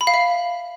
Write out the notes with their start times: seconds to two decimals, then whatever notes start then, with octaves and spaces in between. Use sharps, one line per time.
0.01 B5
0.07 F5
0.14 E5